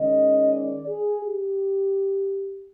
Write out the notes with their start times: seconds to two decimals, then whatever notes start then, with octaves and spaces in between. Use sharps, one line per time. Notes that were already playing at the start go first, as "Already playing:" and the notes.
Already playing: D#3 G#3 C#4 D#5
0.53 D5
0.88 G#4
1.22 G4